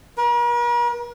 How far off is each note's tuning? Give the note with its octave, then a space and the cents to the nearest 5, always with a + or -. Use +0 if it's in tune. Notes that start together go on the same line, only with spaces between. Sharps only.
A#4 +45